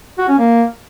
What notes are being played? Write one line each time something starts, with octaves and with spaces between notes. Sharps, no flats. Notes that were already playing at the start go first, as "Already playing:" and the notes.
F#4
C#4
A#3